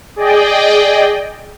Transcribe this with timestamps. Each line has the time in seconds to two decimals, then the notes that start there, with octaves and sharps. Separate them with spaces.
0.16 G#4 D5 D#5 G5